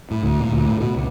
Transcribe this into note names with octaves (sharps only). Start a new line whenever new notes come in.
A2
D2
A#2
D2
A2
B2
C#2